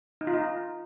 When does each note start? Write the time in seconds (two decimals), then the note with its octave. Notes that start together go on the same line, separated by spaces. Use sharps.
0.21 D#4
0.27 F4
0.33 D#4